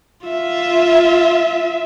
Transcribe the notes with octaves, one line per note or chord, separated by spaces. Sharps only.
F4 E5